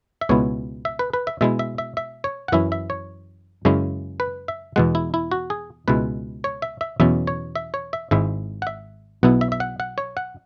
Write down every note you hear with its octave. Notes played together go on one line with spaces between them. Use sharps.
E5
C#2 B2 G#3 B3 E4 C#5
E5
B4
B4
E5
B2 G#3 E4 E5
E5
E5
E5
C#5
F#5
F#2 E3 C#4 E4 E5
E5
C#5
F#2 C#3 G#3 C#4 E4
B4
E5
E2 B2 G#3 F#5
E4
E4
F#4
G#4
C#2 B2 G#3 E4 B4
C#5
E5
E5
E2 B2 F#3 C#4 E5
C#5
E5
C#5
E5
G#1 G#2 G#3 E4 E5
F#5
E5
B1 B2 B3 E4 F#5
E5
E5
F#5
F#5
C#5
F#5